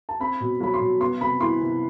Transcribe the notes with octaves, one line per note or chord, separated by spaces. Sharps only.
A5
C4 B5
B2
F#3 B5
C6
B2
B3 C6
C3 B5
E3 C6
C3